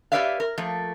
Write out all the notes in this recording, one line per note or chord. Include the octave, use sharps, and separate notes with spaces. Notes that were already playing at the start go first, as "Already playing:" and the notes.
G4 B4 C#5 D5 E5 F5
A#4
F3 A3 A#3